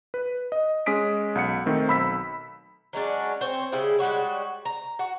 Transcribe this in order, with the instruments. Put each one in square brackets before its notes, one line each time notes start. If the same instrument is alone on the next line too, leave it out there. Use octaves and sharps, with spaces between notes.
[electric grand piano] B4
D#5
G#3 C#4 D#6 B6 D7
B1 F#5 C#7
D#3 A3 C4
B1 B5 E6 B6
[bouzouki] F#3 G#3 C#4 D4
C4 C5 C#5
C#3 G3 E4 G#4
G3 G#3 F#4 C#5
A#5
F#4